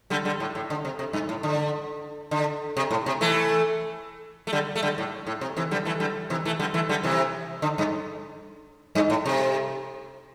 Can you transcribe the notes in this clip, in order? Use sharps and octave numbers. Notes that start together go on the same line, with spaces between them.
D3 G3
D3 G3
A2
A2
D3
C3
C3
G2
A2
D3
D3
C3
A2
C3
E3 A3
A3
D3 G3
A3
D3 G3
A2
A2
C3
C3 E3
D3 G3
E3 A3
D3 G3
C3 E3
E3 A3
D3 G3
E3 A3
D3 G3
C3 E3
D3
G2
G2
A2
C3